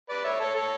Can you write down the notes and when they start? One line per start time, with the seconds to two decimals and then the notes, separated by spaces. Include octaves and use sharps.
0.10 B4 D5
0.24 C#5 E5
0.40 A4 C#5
0.55 A4 C#5